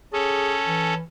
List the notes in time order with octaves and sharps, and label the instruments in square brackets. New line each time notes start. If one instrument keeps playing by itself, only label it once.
[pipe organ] C#4 A4 [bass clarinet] G#4
[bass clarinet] E3